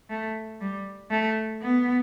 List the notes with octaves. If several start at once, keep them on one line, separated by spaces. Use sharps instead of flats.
A3
G3
A3
B3